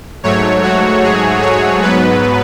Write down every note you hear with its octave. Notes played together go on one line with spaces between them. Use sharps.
G#2 F#3 A3 C#5
F#4
G#4
C#5
G#2 F#3 B3 B4